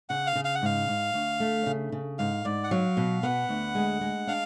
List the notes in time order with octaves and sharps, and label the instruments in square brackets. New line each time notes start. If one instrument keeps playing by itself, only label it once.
[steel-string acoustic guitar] C#3 [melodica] F#5
[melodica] F5
[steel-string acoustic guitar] C#3
[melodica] F5
F#5
[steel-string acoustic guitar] G#2 [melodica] F5
[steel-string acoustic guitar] G#2
D2
A3
C#3
C#3
[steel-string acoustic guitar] G#2 [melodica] F5
[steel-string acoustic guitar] G#2 [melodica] D5
[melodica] F#5
[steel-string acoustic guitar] F#3 [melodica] F5
[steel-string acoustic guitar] B2
[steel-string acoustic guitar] B3 [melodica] F#5
[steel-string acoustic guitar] D2
G#3
G#3
[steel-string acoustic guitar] D4 [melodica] F5